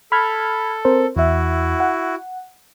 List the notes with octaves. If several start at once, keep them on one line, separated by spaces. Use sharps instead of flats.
A4 B5 F6 G#6
C4 A#4 C5
E2 E4 F#4 E5
F#5